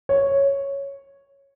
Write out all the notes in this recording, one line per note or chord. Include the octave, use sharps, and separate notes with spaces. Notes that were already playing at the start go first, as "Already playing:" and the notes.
C#5